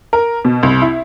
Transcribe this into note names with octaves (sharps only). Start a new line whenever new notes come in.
A#4
B2
C2
E4